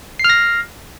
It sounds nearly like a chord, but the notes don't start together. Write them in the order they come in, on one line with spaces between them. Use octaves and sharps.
C7 F6 A#6